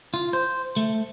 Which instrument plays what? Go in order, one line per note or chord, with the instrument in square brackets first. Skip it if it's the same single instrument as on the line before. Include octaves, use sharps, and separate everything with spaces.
[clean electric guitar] F4
C5
A3